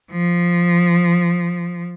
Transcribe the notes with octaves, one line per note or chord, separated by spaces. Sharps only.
F3